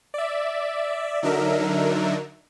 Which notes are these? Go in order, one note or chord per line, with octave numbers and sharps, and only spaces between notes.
D5 E5
D3 F#3 D4 D#4 A#4 E5